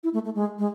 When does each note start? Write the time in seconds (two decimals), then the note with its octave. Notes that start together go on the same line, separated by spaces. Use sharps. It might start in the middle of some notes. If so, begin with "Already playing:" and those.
0.04 E4
0.14 A3
0.25 A3
0.35 G#3
0.59 G#3